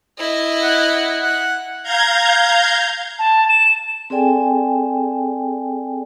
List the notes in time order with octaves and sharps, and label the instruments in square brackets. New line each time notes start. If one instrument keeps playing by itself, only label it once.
[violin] E4 D#5
[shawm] F#5
F#5
[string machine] F5 A#5 G6 G#6
[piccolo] A5
E7
[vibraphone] C4 G#4 A4 D5 G5 G#5